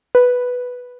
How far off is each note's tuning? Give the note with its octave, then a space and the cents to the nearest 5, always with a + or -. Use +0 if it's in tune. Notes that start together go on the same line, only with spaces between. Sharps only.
B4 +0